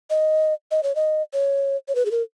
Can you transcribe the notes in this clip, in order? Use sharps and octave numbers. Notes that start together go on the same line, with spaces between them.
D#5
D#5
C#5
D#5
C#5
C#5
B4
G#4
A#4